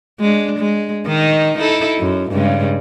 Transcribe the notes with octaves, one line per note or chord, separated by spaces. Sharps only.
G#3 D4
G#3
D#3 D#4
D#4 E4 A4
F#2
G2 C#3 G#3